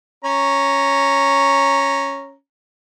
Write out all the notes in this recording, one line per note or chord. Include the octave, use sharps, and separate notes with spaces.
C#4 A#5